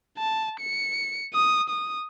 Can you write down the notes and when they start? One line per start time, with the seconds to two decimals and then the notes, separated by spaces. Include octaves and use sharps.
0.18 A5
0.60 C#7
1.33 D#6
1.70 D#6